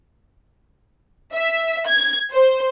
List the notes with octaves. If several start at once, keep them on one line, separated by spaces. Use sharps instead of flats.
E5
G#6
C5